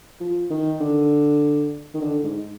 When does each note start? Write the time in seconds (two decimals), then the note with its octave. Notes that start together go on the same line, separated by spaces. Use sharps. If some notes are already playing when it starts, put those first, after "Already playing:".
0.21 F3
0.51 D#3
0.81 D3
1.94 D#3
2.02 D3
2.24 G#2